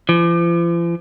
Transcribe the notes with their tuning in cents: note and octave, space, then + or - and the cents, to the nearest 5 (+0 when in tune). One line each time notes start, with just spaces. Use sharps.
F3 -45